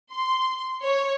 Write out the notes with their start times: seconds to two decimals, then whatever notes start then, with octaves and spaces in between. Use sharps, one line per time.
0.11 C6
0.82 C#5